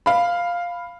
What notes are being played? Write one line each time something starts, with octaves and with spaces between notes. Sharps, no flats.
F5 B5